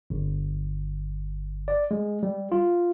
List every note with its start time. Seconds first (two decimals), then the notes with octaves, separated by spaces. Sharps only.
0.10 G1
1.68 D5
1.91 G#3
2.23 G3
2.52 F4